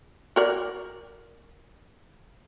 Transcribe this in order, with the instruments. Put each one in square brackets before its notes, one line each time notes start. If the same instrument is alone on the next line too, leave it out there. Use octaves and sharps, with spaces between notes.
[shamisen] F#4 A#4 D5